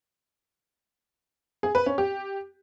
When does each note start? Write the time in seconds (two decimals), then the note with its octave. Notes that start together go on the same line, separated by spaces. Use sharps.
1.63 G#4
1.75 B4
1.86 C#4
1.98 G4